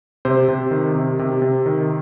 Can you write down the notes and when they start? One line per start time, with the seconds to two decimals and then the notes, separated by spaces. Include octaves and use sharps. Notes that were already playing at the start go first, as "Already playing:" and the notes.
0.25 C3 C5
0.48 C3
0.71 D#3
0.95 C3
1.19 C3
1.42 C3
1.66 D#3